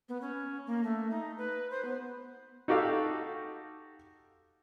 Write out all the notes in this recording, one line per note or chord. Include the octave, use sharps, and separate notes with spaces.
B3
C#4
A#3
A3
D#4
B4
C5
B3
D#4 F#4 G4 A4 F5